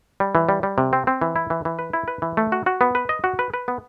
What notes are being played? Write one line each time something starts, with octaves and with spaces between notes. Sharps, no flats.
G3
E3
G3
G3
C3
C4
C4
E3
E4
E3
E3
B4
E4
B4
E3
A3
F#4
F#4
B3
B4
D#5
F#4
B4
B4
B3